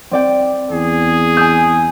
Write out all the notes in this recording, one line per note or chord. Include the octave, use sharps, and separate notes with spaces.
C4 D5 G5
E2 G#4
G#5 D#6 E6 G6 G#6